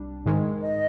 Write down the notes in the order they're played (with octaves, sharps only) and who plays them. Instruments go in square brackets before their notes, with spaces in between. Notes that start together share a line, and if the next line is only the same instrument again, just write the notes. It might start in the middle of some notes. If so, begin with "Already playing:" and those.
Already playing: [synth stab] C2 G3 D4
G#2 D#3 G#3
[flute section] D#5